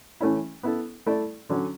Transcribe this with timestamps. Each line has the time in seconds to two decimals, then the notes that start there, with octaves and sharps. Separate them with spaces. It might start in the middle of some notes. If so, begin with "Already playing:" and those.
0.21 E3 A3 C#4 E4
0.63 B3 E4 A4
1.06 A3 E4 A4 D5
1.49 D3 F#3 C#4